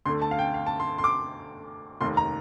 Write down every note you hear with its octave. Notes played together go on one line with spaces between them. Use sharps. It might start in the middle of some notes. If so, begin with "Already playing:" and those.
D2 D3 A3 C6
A5
F5
G5
F5
A5
C6
C6
D6
F1 D#2 D#3 C6
A#5